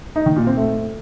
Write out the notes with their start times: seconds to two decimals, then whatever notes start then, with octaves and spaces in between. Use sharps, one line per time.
0.16 D#4
0.26 D#3
0.36 A#2
0.47 C4
0.57 A3